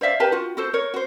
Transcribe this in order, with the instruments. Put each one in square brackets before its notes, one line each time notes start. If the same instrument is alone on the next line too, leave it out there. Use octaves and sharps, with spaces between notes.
[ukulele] C5 D5 E5 F5
G4 A#4 B4 A5
F4 F#4
F#4 A4 C5
A#4 C#5
F#4 C5